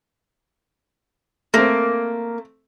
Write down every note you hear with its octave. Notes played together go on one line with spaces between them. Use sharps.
A3 A#3 C4